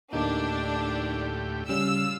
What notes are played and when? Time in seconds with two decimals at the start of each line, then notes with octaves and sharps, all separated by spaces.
0.13 D2 A2 A#3 D4 D#4 G4
1.69 C#3 G3 C#4 F4 E6